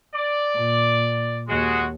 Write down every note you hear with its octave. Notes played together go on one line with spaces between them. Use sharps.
D5
A#2
D#2 G#3 F#4